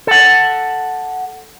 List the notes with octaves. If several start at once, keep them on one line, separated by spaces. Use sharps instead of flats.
A4 F#5